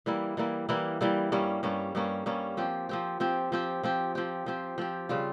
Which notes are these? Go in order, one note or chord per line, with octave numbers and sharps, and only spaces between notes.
E3 G3 A#3 E4
E3 G3 A#3 E4
E3 G3 A#3 E4
E3 G3 A#3 E4
G2 G3 A#3 C#4
G2 G3 A#3 C#4
G2 G3 A#3 C#4
G2 G3 A#3 C#4
F3 C4 G4
F3 C4 G4
F3 C4 G4
F3 C4 G4
F3 C4 G4
F3 C4 G4
F3 C4 G4
F3 C4 G4
C#3 G3 C4 F4